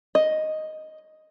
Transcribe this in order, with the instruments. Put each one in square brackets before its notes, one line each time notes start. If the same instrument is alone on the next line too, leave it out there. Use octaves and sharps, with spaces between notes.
[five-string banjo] D#5